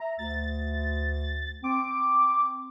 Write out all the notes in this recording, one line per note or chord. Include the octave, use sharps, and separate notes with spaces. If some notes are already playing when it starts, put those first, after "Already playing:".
E5 A#5
D2 A6
C4 D6